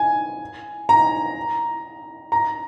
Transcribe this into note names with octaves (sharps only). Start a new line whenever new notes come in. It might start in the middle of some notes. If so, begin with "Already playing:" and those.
Already playing: G#5
A#5
A#5